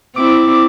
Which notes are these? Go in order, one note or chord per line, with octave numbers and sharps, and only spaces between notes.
C4 E4 D6